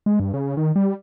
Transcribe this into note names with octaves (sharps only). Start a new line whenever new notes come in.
G#3
G2
C#3
D#3
G3